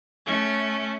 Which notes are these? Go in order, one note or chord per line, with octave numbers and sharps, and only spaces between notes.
A3 C#4